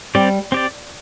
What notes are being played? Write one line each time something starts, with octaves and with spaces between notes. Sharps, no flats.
G3 C4 G4 D5
C4 G4 D5